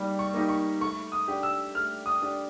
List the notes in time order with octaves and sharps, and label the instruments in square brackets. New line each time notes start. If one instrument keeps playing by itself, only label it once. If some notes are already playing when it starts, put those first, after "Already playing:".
Already playing: [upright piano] G3 A#3 D#4 G4
[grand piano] C#6
[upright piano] A#3 D#4 G4
[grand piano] C#6
[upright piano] A3 [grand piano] C#6
[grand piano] D#6
[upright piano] D4 G4
[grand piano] E6
[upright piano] A3 [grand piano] F6
[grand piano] D#6
[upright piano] D4 G4